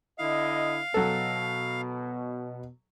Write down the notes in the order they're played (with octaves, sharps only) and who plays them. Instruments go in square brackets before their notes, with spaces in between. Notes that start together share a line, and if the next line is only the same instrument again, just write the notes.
[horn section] D3 E4 D#5 [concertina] F5
[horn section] B2 [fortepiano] F#3 A4